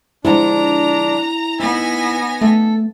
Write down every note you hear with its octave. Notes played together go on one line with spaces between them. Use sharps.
D3 F3 G#3 D4 E4 A#5
B3 D#4 G#5 B5 E6 A#6
A3 A4